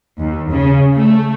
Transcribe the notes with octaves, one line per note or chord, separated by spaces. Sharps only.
D#2
C#3
A3